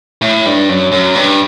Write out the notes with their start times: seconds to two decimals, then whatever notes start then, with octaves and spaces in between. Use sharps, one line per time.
0.22 A2
0.46 G2
0.69 F#2
0.92 F#2
1.15 G2